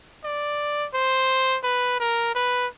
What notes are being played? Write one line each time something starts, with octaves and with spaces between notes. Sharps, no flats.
D5
C5
B4
A#4
B4